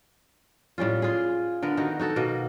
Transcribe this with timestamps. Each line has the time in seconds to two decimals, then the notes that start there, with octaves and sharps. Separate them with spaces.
0.78 A2 G3 C#4 F4
1.02 F4 G#4
1.63 D3 B3 A#4
1.77 D#3 D#4 F#4
2.00 D#4 F#4 A4
2.16 B2 A#3 D#5